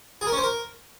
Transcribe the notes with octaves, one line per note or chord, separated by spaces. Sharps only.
G#4
A#4
C#4
C5
A#4